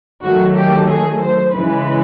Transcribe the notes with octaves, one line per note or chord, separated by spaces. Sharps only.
D#3 F#3 A3 F#4
G4
G#4
C5
C#3 E3 G#3 B4